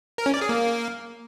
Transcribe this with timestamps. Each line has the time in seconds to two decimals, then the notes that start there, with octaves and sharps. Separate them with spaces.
0.18 A#4
0.26 C#4
0.34 D5
0.41 G#4
0.49 A#3